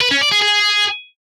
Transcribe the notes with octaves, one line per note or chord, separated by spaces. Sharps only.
B4
C#4
D5
G#4
G#4